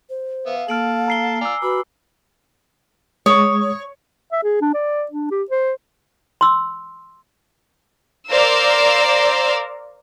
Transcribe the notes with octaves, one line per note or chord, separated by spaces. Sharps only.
C5
B3 E5 F5
A#3 A4 A5 F6 D7 F#7
A#5 C7 G7
D5 G#5 A#5 D6 E6
F#4 B4 B5 D6
G#3 C#5 D#6
E5
G#4
D4
D5
D4
G4
C5
C6 E6
A#4 C5 D5 F5 E6